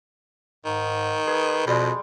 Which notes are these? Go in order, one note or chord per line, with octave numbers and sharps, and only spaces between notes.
G#2 D#3
G#4 B4
F2 B2 G3 G#3